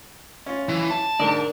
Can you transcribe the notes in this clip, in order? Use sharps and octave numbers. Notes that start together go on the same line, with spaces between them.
C#4 F4
E3
A5
G#2 D3 A#4 D5 D#6